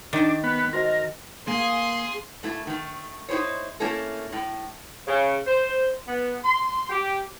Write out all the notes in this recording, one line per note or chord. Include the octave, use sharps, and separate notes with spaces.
D#3 D4
B3
F#4 A#4 C5 D#5
D#5
A#3 G#4 C6
A#2 A3 E4
D#3 A3
D#4 E4 G4 G#4 C5 C#5
A3 A#3 C#4 E4 A4 A#4
A2
C#3
C5
B3
C6
G4